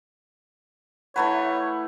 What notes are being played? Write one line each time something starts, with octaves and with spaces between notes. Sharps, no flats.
E3 A3 B4 C#5 F#5 A#5 B5